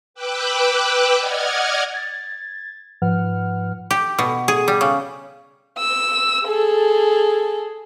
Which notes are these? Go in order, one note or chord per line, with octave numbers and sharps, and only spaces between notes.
B4 G5 D6 E6 F#6
D5 D#5 F#5 F6 G#6
G#6 A6
G#2 F3 B4 F#5 F6
G4
B2
G#4
G3
C#3
E6
G#4 A4